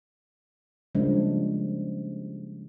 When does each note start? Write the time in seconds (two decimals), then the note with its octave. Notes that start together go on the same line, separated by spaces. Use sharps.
0.95 C#3 F3 G3 G#3 A#3 D4